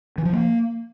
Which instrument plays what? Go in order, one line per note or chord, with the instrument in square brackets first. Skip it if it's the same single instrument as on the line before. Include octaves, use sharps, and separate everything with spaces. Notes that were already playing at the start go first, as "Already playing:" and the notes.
[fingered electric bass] E3
F3
A#3